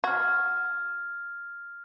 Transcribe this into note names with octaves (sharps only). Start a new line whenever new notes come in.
F#4 F6 G#6